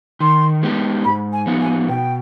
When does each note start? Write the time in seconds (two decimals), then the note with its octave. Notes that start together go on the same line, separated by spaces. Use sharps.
0.20 D#3 C6
0.63 G#3 B3 D#4 G4
1.04 G#2 B5
1.33 G#5
1.46 F3 B3 D#4
1.61 G#5
1.89 B2 G5